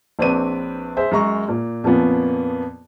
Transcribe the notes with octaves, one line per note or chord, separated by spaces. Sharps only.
A#1 C4 D4 B4 C#5 D#7
G#4 C5 E5
F#2 G#3 A#5 C#6
A#2
F2 A#2 F3 B3 C#4